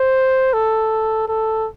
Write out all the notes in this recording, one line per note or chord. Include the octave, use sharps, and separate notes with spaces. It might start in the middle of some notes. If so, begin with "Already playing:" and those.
Already playing: C5
A4
A4